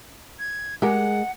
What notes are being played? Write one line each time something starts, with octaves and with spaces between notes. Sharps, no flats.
G#6
G#3 G4 G#4 A#4 F#5